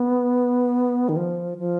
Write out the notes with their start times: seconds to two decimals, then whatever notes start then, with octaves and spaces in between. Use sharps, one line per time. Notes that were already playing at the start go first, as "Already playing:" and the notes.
Already playing: B3
1.09 D#3
1.16 F3
1.58 F3